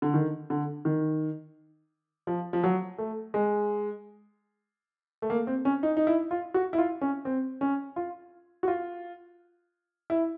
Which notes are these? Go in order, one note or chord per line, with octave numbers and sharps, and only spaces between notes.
D3
D#3
D3
D#3
F3
F3
F#3
A3
G#3
A3
A#3
C4
C#4
D#4
D#4
E4
F4
F#4
E4
F4
C#4
C4
C#4
F4
F#4
F4
E4